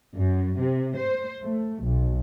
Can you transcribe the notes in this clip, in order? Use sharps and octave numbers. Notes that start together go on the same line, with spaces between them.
F#2
C3
C5
A3
B1